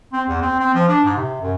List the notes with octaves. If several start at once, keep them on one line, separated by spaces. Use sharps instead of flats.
C4
E2
C4
C4
F3
D4
G#2
C3
F#2